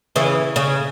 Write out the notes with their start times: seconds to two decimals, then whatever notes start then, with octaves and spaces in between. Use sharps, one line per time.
0.16 C#3 E3
0.56 C#3